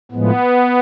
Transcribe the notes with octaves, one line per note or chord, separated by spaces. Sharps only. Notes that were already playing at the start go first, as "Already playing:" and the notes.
A2 F3 G#3 B3